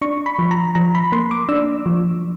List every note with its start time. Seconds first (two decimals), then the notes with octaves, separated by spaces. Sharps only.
0.02 D4 C#6
0.26 B5
0.39 F3
0.51 A#5
0.75 F3 A#5
0.95 B5
1.12 A#3 C6
1.31 D6
1.49 D4 E6
1.86 F3